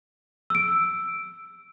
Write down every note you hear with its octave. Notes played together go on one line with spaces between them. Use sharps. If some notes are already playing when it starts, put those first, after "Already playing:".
E6 D7